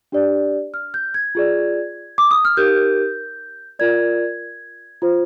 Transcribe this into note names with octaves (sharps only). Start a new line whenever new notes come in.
D4 G4 D5
F6
G6
G#6
F4 G#4 D5
D6
D#6
F6
D#4 G4 A#4 G6
F4 A#4 D5 G#6
F4 C5